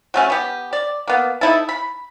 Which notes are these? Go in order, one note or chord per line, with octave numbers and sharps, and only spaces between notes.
F#3 A3 C#4
B3 G4
D5
A#3 B3
D#4 E4 A4
B5